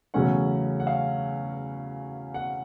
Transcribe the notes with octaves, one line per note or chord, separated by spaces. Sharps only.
E2 C#3 F#3 A3 C#4 F#5
F#5
F5
F#5